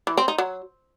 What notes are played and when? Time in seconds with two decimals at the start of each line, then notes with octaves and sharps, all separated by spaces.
0.07 E3
0.17 C4
0.28 D#4
0.38 F#3